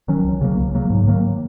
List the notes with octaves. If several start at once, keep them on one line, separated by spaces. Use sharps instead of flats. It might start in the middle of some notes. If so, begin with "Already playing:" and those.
D#3 F#3 C#4
C#2
C#3 F#3 A#3
C#2
C#3 F#3 A#3
G#2
D#3 F#3 A#3